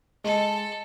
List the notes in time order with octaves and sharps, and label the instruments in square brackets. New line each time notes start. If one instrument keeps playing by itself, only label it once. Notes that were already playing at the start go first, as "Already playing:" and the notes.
[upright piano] G#3 [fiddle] A4